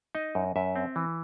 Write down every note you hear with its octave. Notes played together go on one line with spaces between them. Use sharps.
D#4 D#5
F#2
F#2 E5
C4
E3